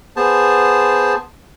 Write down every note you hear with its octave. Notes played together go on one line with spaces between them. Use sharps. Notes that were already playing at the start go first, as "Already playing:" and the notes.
B3 G#4 C5 A5